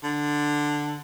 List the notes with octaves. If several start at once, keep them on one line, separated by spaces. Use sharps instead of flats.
D3